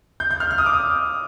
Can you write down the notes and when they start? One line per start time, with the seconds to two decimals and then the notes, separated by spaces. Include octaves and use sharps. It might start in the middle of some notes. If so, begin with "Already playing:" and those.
0.20 G6
0.31 G6
0.40 F6
0.51 F6
0.58 D#6
0.66 D6
0.74 D#6